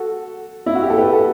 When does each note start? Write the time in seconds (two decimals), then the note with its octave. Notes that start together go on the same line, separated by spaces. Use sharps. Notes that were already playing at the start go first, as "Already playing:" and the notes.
Already playing: F#4 A4
0.66 E4
0.75 F#4
0.83 G4
0.90 A4
0.98 G4 B4
1.13 F#4 A4